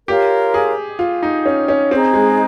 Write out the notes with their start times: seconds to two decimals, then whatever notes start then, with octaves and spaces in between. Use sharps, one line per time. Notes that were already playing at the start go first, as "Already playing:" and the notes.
0.07 F4 G4 A#4 C#5 F5
0.54 G#4
0.99 F4
1.23 D#4
1.46 C#4
1.68 C#4
1.91 C4 D#4 G#4 D#5
2.14 G#3